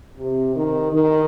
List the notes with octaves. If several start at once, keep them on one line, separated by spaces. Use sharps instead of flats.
C3
D#3
D#3